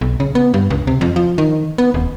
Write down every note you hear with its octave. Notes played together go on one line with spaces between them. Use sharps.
B1
C#3
B3
G2
C#2
C3
F2
F3
D#3
B3
D#1